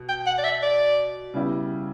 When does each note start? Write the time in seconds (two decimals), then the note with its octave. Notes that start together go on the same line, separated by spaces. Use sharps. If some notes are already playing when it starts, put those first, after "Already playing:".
Already playing: B2
0.09 G5
0.27 F#5
0.38 D5
0.44 E5
0.62 D5
1.34 C#3 G3 B3 E4 G4